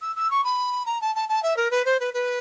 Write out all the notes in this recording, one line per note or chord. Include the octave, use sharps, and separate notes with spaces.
E6
E6
C#6
B5
A#5
A5
A5
A5
E5
A#4
B4
C5
B4
B4